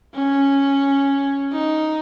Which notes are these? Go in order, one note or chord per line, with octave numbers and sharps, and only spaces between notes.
C#4
D#4